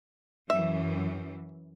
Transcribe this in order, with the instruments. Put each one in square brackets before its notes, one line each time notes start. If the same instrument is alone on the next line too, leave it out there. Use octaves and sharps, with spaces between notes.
[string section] F#2 E3 [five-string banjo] E5